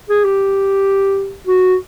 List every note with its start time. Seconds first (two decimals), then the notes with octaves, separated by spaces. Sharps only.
0.10 G#4
0.24 G4
1.47 F#4